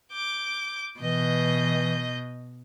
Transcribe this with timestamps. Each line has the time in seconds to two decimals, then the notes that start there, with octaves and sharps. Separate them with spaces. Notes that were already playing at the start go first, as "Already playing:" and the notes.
0.12 D6 G6
1.00 B2 E3 D#5 G6